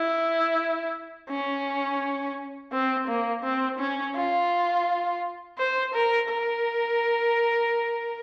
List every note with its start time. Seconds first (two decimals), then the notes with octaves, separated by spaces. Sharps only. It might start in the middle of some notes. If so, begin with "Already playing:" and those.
Already playing: E4
1.29 C#4
2.72 C4
3.07 A#3
3.43 C4
3.78 C#4
4.15 F4
5.58 C5
5.93 A#4
6.29 A#4